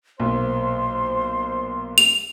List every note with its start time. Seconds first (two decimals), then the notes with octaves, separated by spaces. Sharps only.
0.20 B1 A#2 C5 C6
1.98 F7